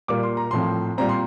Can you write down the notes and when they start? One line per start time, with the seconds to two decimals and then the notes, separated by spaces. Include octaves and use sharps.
0.08 A#2 G3 A#3 D6
0.23 C6
0.37 A#5
0.51 A2 F3 C4 C6
0.98 A#2 G3 C4 A#5
1.09 C6